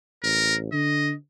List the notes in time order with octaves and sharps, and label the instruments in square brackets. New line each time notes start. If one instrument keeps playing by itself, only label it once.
[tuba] A1 [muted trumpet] A#4
[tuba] D3 [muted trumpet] D#5